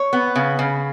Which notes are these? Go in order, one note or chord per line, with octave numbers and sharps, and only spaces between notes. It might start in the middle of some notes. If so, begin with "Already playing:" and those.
Already playing: C#5
B3
C#3
C#3